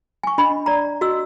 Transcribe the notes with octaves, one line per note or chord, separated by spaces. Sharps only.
G#5 C#6
D4 D#5 B5
D5 A#5
F#4 D#5 E6